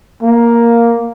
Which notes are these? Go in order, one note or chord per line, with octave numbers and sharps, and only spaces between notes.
A#3